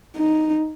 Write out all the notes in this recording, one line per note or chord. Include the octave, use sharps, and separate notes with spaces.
D#4